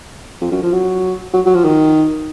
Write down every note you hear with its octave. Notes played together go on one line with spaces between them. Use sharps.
F2
F#2
F3
F#3
F#3
F#3
F3
D#3